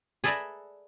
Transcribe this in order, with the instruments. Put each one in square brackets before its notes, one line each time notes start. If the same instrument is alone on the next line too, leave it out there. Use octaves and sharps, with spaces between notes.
[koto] G#4 A4 B4 D5 E5 A#5